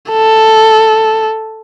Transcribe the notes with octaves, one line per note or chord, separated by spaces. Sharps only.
A4